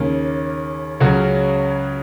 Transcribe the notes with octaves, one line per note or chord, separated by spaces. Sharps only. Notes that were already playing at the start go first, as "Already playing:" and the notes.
Already playing: D#2 C#3 A#3 C#4
C#2 C#3 F#3 C#4 F#4